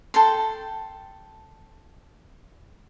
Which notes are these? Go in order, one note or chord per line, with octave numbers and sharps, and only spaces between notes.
A4 G5 C6